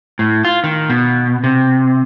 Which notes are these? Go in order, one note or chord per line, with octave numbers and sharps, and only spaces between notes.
A2
F4
D#3
B2
C3